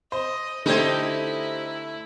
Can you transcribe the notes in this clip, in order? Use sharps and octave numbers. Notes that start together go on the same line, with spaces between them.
C5 D#5
D3 A3 D#4 E4 G4 C5 G#6